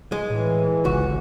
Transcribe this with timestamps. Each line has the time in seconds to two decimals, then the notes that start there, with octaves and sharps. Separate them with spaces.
0.12 G#3
0.30 A2 E3
0.85 G1 C#2 F#4